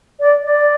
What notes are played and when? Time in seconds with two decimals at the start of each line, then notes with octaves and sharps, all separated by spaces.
0.20 D5
0.43 D5